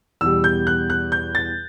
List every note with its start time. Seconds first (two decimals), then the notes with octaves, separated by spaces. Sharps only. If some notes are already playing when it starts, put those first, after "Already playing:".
0.21 E2 B2 G3 E6
0.44 G6
0.67 F#6
0.90 F#6
1.12 G6
1.35 A6